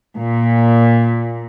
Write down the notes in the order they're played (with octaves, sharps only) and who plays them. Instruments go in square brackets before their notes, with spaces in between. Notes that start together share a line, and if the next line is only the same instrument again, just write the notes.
[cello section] A#2